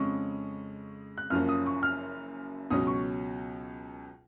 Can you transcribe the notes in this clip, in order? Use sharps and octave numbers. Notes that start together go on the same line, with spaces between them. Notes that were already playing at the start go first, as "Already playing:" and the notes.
Already playing: F2 C#3 G#3 C#4 C#6
F#6
F#1 F#2 F3 A#3 C#4 F6
D#6
C#6
F6
C#2 B2 F#3 C#4 D#6
C#6